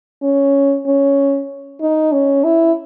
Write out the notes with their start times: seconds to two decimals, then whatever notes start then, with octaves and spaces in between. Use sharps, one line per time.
0.23 C#4
0.86 C#4
1.81 D#4
2.12 C#4
2.44 E4